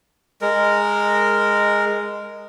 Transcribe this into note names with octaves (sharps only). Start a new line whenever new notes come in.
G#3 A#4